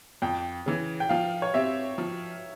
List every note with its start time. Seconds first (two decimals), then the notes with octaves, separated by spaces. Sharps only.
0.22 F2 G5
0.66 C#3 E3
1.00 G5
1.09 F3 F5
1.42 C#5
1.54 C4 G4 C#5 E5
1.98 F3